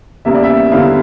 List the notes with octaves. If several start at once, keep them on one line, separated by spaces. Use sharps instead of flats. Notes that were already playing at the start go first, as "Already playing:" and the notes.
E2 C#3 G3 A#3 E5
D5
E5
E2 D3 G3 C#4 E4 F5